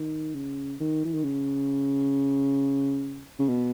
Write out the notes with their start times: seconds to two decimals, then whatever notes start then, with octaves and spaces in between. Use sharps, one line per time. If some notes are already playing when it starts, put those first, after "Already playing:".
Already playing: D#3
0.34 C#3
0.80 D#3
1.05 E3
1.14 D#3
1.24 C#3
3.39 C#3
3.48 B2